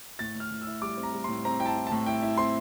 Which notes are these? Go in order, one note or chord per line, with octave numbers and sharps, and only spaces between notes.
A2 A6
A2 F6
A2
E6
E4
G3 D6
C4
A#5
G3
A2 C6
C4 A#5
E4 G5
A5
E4
A2 A5
E4 G5
E4
C4 C6